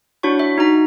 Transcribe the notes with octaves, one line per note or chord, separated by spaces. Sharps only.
D4 E4 F#4 C#5 C#6
E5
D#4 F#4 A#5